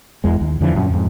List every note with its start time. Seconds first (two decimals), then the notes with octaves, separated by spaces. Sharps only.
0.24 A1 E2 G#3
0.41 D#2
0.61 F2 D3 E3 F3
0.75 F#2 A#2 C#4
0.90 F2 G#2